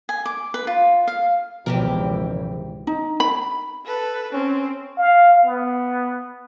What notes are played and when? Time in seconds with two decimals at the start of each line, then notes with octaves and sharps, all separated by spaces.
0.09 G#5
0.26 D6
0.54 B4
0.67 F4
1.07 F5
1.66 G#1 C#2 B2 E3 F3 G4 A#4
2.87 D#4
3.20 B5
3.85 A4 B4
4.33 C4 C#4
4.97 F5
5.45 B3